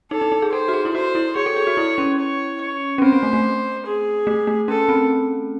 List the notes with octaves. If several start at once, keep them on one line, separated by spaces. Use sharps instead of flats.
D#4 A4
D#4
D#4
G#4
A4 C5
F#4
G#4
E4
F#4 C5
E4
G#4 C#5
A4
G#4
F#4
E4
C#4
C#5
C#5
C#4
C4 C5
C4
A3
A3
G#4
A3
A3
C#4 A4
C4